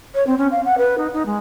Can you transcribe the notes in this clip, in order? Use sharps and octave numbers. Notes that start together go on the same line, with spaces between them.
C#5
C4
C#4
F5
F#5
B4
D#4
D#4
G#3